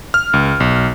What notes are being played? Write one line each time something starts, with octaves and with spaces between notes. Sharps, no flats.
F6
C#2
B1